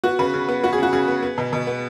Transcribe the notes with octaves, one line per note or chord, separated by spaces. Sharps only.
B3 F#4
C#3 B4
C#3
B3
B3 F#4
G#4
C#3 F#4
C#3 G#4
B3
B3
B2
B2
B3